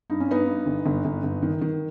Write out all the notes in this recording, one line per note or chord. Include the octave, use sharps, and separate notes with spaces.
G2 D#4
C#4
G2 B3 D#4
G2
G1
G1
G1
G1
D#3
D#3